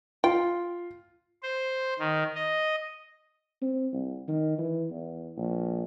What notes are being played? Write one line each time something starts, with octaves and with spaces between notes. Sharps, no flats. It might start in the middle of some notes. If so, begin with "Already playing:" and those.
F4 G5
C5
D#3
D#5
C4
C2
D#3
E3
E2
A#1